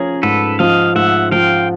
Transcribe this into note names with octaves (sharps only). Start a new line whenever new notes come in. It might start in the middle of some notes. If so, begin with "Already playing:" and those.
Already playing: F3 C#4 G#4 A#4
G#2 A4 B4
F3 D#5 F5
G#2 E5 F#5
F3 F5 G5